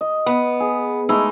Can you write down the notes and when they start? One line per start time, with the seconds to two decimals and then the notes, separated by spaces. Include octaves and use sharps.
0.01 D#5
0.26 B3
0.60 G#4
1.09 G#3 A3 D#4 E4